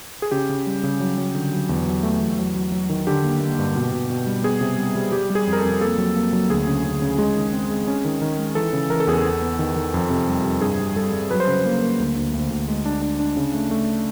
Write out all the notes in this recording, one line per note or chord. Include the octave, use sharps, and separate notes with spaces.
G#4
C#3 G4
C#3
G3
C#3
F#3
F#3
D3
F#3
E2
F#3
A3
E2
F#3
F#3
F#3
D#3
D3 G4
A#3
A#3
G2
B2
B2
B2
G3
B3 G#4
C3
G3
G3
G3 G4
G3
G#4
F2
A#4
A4
F2
A#3 A4
F#3
A#3
F#3
D2 G#4
C#3
C#3
C#3
G#3 G#4
D#3
C4
G#3
C#4
D#3
D#3
G#3
E3 A4
C#3
E3 A#4
A4
E2 G#4
A4
B3
B3
D#3
D#3
F2
C3
G3
C3
G2 G#4
G3
G3 A4
G3
F#3 B4
C5
C#3 B4
A#3
A#3
D2
D2
D2
D2
G#3
D4
D4
D4
C#3
A3
A3